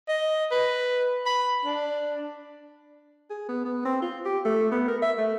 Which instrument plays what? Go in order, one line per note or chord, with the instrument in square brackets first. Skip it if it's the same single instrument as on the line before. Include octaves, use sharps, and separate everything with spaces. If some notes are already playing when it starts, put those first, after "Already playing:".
[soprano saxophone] D#5
B4
B5
D4
[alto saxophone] G#4
B3
B3
C4
F4
G4
A3
B3
A#4
E5
A3